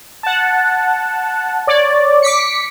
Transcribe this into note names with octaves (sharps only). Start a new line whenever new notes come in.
F#5 A5
C#5 D5
D6 B6 C#7